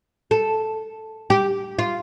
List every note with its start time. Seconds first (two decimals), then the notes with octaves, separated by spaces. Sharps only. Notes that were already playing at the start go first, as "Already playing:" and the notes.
0.31 A4
1.30 G4
1.79 F4